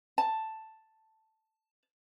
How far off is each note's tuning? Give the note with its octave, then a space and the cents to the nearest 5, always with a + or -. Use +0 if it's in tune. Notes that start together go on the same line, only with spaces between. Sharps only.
A5 +5